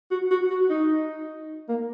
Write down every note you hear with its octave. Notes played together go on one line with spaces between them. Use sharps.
F#4
F#4
F#4
D#4
A#3